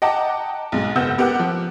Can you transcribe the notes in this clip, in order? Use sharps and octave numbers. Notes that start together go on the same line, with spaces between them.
D#5 F#5 G5 A5 A#5 D6
B1 G#2
F#1 B3 F#5 E6 G6
B3 G4 A#4 F#5 D6 F#6
F3